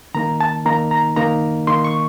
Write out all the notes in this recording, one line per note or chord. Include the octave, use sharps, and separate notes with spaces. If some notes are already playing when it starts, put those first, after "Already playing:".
D#3 A#3 D#4 A#5
A5
D#3 A#3 D#4 A#5
A#5
D#3 A#3 D#4 A#5
D#3 A#3 D#4 C6
C#6